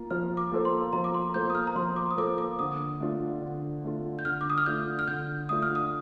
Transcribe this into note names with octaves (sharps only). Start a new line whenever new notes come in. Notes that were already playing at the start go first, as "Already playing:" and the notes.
Already playing: A#3 F4
F3 F6
D6
A#3 F4 A4 C5
C6
F3 A#5
D6
C6
A#3 F4 A4 C5 G6
D#6
F6
A#5
F3 C6
D6
D#6
A#3 F4 A4 C5 D6
D6
D3 D#6
A3 D4 F4
D3
A3 D4 F4
G6
D3 F6
D6
D#6
F6
A3 D4 F4 G6
F6
D3 G6
A3 D4 F4 D#6
F6
D#6